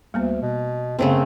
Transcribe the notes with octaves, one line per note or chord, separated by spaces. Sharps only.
D2 G3 A#3 B3
B2
F#2 C#3 A3 B3 C4 C#5 F5